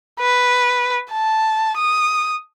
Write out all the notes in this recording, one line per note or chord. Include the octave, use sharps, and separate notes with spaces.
B4
A5
D#6